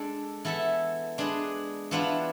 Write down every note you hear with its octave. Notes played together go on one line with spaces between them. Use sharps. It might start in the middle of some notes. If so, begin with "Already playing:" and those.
Already playing: G#3 D4 A4 D5
E3 B3 E4 A4 E5
G#3 D4 G#4 B4
E3 B3 D4 F4 B4